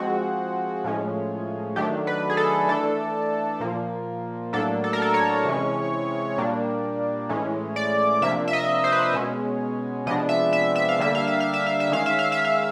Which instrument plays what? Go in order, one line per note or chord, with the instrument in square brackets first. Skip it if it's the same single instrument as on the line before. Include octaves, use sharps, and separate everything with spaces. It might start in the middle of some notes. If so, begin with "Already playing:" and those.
Already playing: [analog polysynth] F3 G#3 C4 F#4
A2 F3 G#3 C#4
D#3 F#3 A3 D4 G4
B4
G#4
A4
E3 A3 D4 A4
A#2 F3 A#3
A2 F#3 A#3 D4 A4
A4
A#4
A4
C#5
C3 E3 G#3 C#4
A#2 G3 A#3 D4
A2 E3 G#3 C#4
D5
C3 F3 A#3 D4 E5
E5
D#5
C5
B4
C5
B2 G#3 C#4
C3 F3 G#3 B3 D4 D#5
E5
E5
E5
F5
D3 G3 A#3 D4 E5
F5
E5
F5
E5
F5
E5
D#3 G#3 C#4 F5
E5
F5
E5
F5